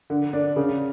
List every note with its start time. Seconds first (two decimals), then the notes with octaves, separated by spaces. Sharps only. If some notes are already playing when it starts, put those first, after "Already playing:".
0.10 D3
0.33 D4
0.56 C#3